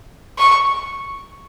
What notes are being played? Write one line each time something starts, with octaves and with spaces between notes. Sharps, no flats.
C#6